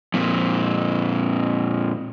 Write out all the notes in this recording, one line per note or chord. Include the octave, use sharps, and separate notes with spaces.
F2 A#2